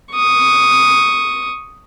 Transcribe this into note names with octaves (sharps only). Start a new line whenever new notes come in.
C#6 D#6